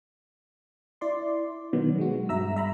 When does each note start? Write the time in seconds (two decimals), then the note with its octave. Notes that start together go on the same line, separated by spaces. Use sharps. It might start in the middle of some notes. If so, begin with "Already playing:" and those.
1.01 E4 D5 C6
1.73 B2 D#3 F#3 B3
1.98 G#3 F#4
2.29 G2 E5 A#5 E6
2.56 E5 A#5 B5